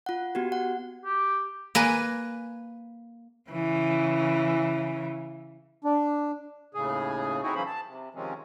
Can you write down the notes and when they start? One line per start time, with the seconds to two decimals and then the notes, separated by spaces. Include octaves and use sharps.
0.06 F4 F#5
0.35 B3 F#4 G4
0.52 F#5
1.05 G4
1.75 A#3 B4 G#5
3.50 C#3 E3
5.84 D4
6.74 D#2 A2 C#3 G#4
7.43 C4 D#4 E4 F#4 G#4
7.55 E3 F#3 A#3 C#4 C5 B5
7.66 A5
7.87 C3
8.15 C3 D#3 F3 G#3 C4 C#4